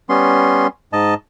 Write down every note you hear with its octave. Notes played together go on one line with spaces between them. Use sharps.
G3 B3 C#4 C6
G#2 D#5 A5